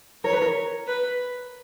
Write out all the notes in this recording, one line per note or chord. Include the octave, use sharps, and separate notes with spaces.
A#4 C#5
B4
A#4
B4